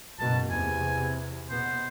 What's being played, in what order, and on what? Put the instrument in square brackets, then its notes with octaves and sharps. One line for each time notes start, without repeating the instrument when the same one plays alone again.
[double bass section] F#1 B2 A#3 [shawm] A5
[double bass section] E2 C3 [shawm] G#5
[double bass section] B2 B3 [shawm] C5